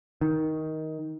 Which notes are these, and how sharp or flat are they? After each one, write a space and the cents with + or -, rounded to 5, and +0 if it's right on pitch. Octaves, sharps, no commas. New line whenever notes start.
D#3 +15